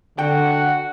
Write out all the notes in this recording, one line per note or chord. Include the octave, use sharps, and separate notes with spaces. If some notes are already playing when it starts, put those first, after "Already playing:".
D3 F#4 G5